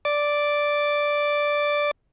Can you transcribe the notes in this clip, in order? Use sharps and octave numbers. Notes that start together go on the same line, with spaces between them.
D5 D6